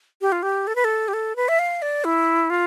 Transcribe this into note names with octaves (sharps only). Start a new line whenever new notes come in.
G4
F4
G4
A4
B4
A4
G4
A4
B4
E5
F5
D5
E4
F4